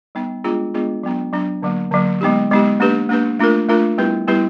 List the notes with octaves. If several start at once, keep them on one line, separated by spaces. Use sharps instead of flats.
G3 B3 D#4
G#3 B3 D4 F4 G#4
G#3 B3 D4 F4 G#4
F#3 B3 D4
F#3 B3 D4
D3 F#3 A#3
D3 F#3 A#3
G#3 B3 D#4 G4
G#3 B3 D#4 G4
A#3 D4 G4 B4
A#3 D4 G4 B4
A3 D4 F4 A#4
A3 D4 F4 A#4
G3 B3 E4 G4 B4
G3 B3 E4 G4 B4